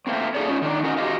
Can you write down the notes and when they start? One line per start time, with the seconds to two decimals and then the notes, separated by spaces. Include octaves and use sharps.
0.07 A3 A#3 C4
0.34 A#3 D#4 G#4 A4 C#5 D5
0.48 C#4 D#4 F4
0.62 D#3 D4
0.84 C#4 D#4 F#4 A#4 C5
0.97 F#4 G4 A#4 C5 D#5 F5